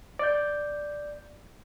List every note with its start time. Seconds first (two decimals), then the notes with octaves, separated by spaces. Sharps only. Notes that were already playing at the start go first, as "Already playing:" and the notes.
0.19 D5 G6